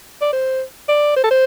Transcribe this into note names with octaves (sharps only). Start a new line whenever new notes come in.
D5
C5
D5
C5
A4
C5